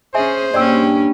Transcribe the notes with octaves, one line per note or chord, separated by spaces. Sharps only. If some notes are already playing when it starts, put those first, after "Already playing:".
C#4 G#4 C5 E5 G#5
G2 A#3 C#4 D5 G5 E6